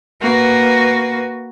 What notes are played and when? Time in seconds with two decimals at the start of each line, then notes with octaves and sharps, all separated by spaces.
0.21 A#3 F#4 B4